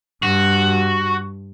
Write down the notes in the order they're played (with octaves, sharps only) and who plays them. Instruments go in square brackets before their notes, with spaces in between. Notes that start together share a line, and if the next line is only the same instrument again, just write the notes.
[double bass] G2 [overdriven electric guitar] F#4